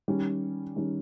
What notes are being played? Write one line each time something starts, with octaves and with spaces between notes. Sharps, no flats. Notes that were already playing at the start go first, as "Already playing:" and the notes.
D#3 G3 C#4
D#3 G3 C#4